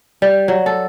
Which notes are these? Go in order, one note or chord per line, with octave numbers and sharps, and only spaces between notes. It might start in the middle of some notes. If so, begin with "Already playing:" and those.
G3
F#3
A4